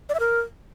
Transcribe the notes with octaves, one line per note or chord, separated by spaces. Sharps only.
D5
E5
A#4